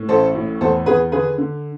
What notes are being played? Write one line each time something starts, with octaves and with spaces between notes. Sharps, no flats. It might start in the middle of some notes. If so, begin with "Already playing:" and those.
Already playing: A2
A1 A4 C5
A2
E2 A4 C5
E2 G#4 B4
D3 G#4 B4
D3